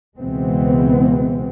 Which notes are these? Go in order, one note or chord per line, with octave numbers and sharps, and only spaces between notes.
C#2 B2 E3 G#3 B3 C4